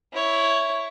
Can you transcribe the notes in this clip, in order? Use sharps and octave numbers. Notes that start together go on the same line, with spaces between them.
E4 C#5